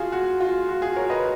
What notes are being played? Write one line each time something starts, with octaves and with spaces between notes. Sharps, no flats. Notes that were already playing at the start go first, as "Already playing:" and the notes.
Already playing: F4 F#4 G#4
F#4
F4
F#4
F4 G#4
A#4 C#5
B4 D#5